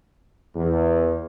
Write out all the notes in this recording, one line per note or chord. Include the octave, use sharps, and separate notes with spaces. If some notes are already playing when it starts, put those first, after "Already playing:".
E2